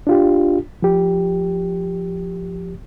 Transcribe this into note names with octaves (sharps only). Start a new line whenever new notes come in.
D4 F4 G4
F3 G4